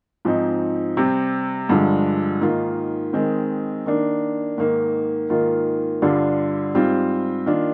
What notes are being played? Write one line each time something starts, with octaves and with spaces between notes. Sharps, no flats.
G#2 F3 C4 D#4
C3 G3 C4
G2 D3 F3 G#3
G#2 D#3 A#3 F4
D#3 G#3 C4
D#3 A#3 D4
G#2 D#3 A#3
G#2 D#3 A#3 F4
G2 D3 G3 D4 F4
G#2 G3 C4 F4
D#3 A#3 D4 F4